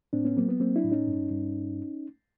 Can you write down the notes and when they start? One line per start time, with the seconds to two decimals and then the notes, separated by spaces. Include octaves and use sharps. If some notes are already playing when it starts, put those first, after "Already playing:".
0.13 A2 C4 D4
0.25 B3 C#4
0.37 F#3 A#3 C4
0.49 B3
0.60 F#3 A#3 C4
0.76 D4 E4
0.84 A2
0.91 C#4 D#4
1.07 G2
1.31 G2